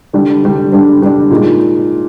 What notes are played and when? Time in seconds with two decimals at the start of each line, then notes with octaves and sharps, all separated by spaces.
0.13 D3 G3 D4
0.43 D3 G3 D4
0.72 D3 G3 D4
1.01 D3 G3 D4
1.31 A#2 G#3 D#4